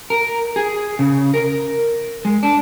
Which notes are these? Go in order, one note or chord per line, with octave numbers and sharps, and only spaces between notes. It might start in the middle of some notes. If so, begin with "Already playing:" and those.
A#4
G#4
C#3
A#4
G#3
D4